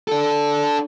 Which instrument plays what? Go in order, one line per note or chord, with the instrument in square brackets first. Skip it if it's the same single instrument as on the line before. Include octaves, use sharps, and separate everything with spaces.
[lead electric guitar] D4 A4